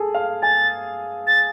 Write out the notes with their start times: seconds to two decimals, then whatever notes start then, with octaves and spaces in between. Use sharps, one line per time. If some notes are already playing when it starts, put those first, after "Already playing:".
Already playing: G#4 A4
0.14 F5
0.42 G#5 A6
1.27 A6